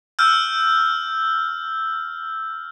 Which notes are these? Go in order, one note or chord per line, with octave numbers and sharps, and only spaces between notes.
E6 F6 G6